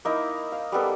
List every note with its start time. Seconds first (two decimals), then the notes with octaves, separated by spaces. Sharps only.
0.05 A#3 D#4 E4
0.52 F5
0.72 G3 A#3 B3 A4